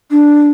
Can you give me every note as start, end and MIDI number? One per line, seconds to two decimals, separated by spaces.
0.11 0.50 62